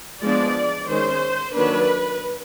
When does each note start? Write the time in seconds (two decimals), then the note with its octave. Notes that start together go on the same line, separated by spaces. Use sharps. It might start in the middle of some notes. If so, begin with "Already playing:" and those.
0.22 F3 G#3 B3 D4 D5
0.88 D#3 G#3 C#4 C5
1.54 D#3 F#3 A#3 D4 B4